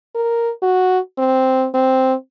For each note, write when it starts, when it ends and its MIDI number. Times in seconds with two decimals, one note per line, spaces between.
0.15 0.51 70
0.62 0.99 66
1.18 1.67 60
1.74 2.14 60